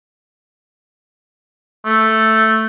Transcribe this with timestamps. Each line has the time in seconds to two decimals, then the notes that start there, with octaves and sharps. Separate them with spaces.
1.86 A3